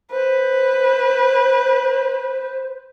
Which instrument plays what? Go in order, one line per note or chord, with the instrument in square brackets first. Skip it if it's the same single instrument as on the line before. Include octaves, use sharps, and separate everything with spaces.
[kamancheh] B4 [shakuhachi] C5